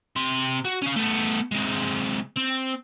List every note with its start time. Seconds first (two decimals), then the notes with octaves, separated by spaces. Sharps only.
0.16 C3 C6
0.65 F#4
0.82 C#4 F5
0.97 A3 B3
1.51 C3 G#3
2.36 C4